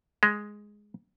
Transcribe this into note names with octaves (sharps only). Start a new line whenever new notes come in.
G#3